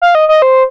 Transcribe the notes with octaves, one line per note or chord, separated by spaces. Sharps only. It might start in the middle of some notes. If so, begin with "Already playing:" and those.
F5
D#5
D#5
C5